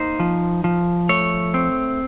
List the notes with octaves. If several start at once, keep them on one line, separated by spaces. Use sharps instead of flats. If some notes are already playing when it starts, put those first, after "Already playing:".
Already playing: A#3 D#4 C5
F3
F3
A3 C#5
C4